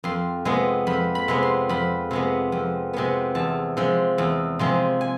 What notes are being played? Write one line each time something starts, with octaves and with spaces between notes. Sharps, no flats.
F2 C6
C3 G#3 B3
F2 B5
B5
C3 G#3 B3
C6
F2 B5
C3 G#3 B3
F2
C3 G#3 B3
E2 A5
C3 F3 G#3
E2
C3 F3 G#3
G#5